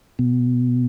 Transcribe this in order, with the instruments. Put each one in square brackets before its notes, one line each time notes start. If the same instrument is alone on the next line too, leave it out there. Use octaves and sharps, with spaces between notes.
[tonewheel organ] B2